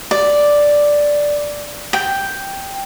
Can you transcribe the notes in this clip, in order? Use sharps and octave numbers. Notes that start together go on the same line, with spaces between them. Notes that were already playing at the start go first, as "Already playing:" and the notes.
D5
G5